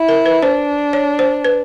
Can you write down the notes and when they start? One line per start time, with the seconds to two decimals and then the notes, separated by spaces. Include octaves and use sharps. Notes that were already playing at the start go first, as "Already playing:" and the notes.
Already playing: E4
0.08 A#4
0.26 B4
0.42 D4 C5
0.93 C#5
1.19 C5
1.45 B4